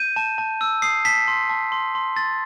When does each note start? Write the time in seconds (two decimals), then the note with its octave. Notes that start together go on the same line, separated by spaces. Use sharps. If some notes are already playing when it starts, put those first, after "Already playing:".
Already playing: G6 D#7
0.16 A5
0.38 A5
0.61 E6
0.82 D#6 C7
1.05 A5 B6
1.28 C6
1.49 A5
1.72 C6
1.95 C6
2.16 C6 A6